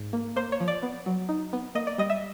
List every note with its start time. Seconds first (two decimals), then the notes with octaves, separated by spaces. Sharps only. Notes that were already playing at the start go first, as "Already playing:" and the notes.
Already playing: G#2
0.13 A#3
0.36 A#3 C5
0.52 C#5
0.60 F3
0.68 D5
0.82 B3
1.06 F#3
1.29 D#4
1.53 B3
1.75 A#3 D#5
1.87 D5
1.98 G3 D#5
2.10 E5